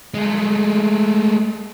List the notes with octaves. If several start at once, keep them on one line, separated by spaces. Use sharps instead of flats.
G#3 A3